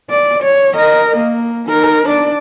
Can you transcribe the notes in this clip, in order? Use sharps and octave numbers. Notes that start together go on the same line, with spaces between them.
D5
C#5
A#4 D#5
A#3
D#4 A#4
D4 D5